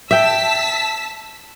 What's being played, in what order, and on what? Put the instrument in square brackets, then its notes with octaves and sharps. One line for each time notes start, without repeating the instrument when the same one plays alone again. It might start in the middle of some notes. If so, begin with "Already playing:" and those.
[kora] E5 G5 [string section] A5 E6 B6